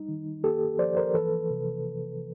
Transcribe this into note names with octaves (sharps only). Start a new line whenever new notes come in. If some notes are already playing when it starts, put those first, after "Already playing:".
Already playing: G3 D#4
D#3
A#3 G4 A4
F3 C5 D5
A#4 C5
E3 A4 B4
C3